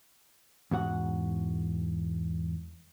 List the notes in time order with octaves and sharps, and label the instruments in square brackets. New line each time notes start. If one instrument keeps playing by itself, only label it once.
[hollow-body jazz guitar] E2 G#2 F#4 F#5